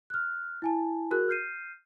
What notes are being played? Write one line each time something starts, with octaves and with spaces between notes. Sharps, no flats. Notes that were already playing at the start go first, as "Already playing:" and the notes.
F6 F#6
E4 G#5 A5
F#4 G#4 A#4 F#6
F6 G6 C7 D#7